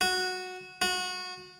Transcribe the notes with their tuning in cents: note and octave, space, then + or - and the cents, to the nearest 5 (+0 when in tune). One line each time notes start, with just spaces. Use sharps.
F#4 -10
F#4 -25